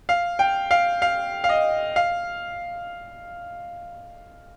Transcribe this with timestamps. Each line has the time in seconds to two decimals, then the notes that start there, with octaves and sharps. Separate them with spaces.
0.09 F5
0.39 G5
0.71 F5
1.02 F5
1.44 F5
1.49 D#5
1.96 F5